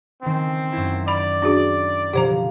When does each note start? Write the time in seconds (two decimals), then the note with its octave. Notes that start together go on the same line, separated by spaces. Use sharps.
0.23 D#3 C4 C#4
0.72 F#2 E4
1.08 D5 B5
1.42 D4 F#4 G#4
2.13 B2 D3 F3 G4 C5 A#5